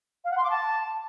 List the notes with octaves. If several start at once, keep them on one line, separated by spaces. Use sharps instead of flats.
F5
F#5
C6
D6
A5